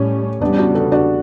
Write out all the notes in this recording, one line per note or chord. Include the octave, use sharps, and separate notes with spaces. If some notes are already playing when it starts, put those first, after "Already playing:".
Already playing: A2 G3 A3 C#4
E2 C#3 G3 B3 D4
D4 F#4
F#4 A4
D4 F#4